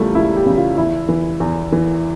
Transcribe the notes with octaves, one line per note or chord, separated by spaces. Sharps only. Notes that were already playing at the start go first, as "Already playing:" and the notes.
Already playing: C#2 C#3 E3 G3 A3
C#2 E4
G4
C#3 E3
F4
E2 E4
E3
E2
E3